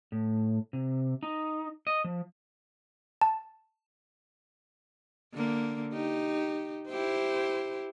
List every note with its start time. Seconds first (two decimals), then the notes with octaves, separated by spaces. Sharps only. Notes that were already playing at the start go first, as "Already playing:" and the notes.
0.12 A2
0.73 C3
1.23 D#4
1.87 D#5
2.04 F3
3.21 A5
5.34 D3 A#3
5.93 D#4 G4
6.89 E4 G4 C5